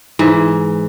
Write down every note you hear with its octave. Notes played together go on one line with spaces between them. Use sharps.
G#2 E3